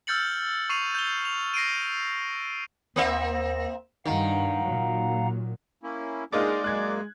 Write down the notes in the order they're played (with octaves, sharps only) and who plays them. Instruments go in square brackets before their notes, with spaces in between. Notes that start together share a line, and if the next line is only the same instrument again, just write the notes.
[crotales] E6 F6 G6 A6 C#7 F#7
C#6 C7 D#7 F7
G6 F7 G7
F7
A#6 C7 D7 D#7
[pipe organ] D#2 A#6 [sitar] A#3 C4 E5
[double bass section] G2 [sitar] D#3 [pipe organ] F5 F#5 A#5
[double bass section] A#2 F#3
[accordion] A#3 C#4 E4
[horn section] G#3 [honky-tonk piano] A#3 D#4 F4 [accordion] D4 F#5 D#6 [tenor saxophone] D5
[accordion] F#2 A#3 [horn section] G#3 [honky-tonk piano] F#6 G#6